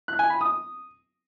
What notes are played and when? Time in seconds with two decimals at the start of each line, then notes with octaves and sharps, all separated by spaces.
0.08 F#6
0.19 G#5
0.30 B5
0.41 D#6